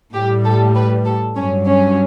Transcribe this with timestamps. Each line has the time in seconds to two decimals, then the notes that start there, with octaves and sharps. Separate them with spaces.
0.13 A2 G3 G4
0.44 A4
0.75 B4
1.05 A4
1.36 G2 F#3 C#4
1.67 C#4